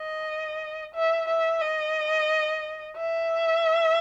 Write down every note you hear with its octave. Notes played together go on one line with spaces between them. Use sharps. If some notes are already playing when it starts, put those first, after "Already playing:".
Already playing: D#5
E5
E5
D#5
E5